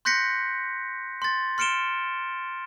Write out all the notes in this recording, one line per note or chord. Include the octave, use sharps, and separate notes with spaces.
C6 F#6 G6 A#6 B6 C#7
C6 A6
C6 F6 C#7 D7 E7 G7